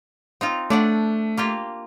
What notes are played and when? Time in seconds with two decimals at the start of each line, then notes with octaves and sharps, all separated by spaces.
0.41 C4 D#4 F4
0.70 A3 D4 D5 F#5
1.37 A#3 F4 G4